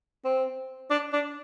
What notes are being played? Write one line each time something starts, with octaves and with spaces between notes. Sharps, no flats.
C4
D4
D4